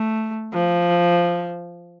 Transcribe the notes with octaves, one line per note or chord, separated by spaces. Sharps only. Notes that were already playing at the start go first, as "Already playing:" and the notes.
Already playing: A3
F3